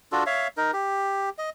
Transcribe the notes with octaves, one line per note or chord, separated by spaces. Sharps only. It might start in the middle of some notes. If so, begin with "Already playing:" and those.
D4 F4 F#4 A4
C#5 E5 F5
D#4 A#4
G4
D#5